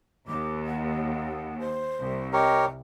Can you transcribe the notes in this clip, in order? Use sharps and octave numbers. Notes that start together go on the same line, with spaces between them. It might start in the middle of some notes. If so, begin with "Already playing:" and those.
D#2 D6
F#5
C5
C2
G4 A#4 C#5 D#5